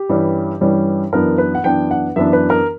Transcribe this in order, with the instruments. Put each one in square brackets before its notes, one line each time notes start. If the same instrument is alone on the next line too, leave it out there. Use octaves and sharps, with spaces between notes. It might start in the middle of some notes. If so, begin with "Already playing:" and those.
Already playing: [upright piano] G4
G2 E3 G3 C#4
G2 E3 G3 C#4
F#2 E3 B3 D4 A#4
B4
F#5
F#2 E3 B3 D4 G5
F#5
F#2 E3 B3 D4 E5
B4
A#4